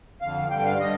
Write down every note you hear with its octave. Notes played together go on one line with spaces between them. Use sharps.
F2 D3 F3 F5
G2 D3 G3 G5
F5
D3 G3 D#5